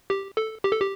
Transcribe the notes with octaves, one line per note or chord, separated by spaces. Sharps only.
G4
A4
G4
A4
G4